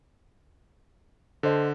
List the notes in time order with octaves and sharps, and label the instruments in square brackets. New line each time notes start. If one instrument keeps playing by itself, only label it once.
[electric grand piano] D3 [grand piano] A4 C5 D#5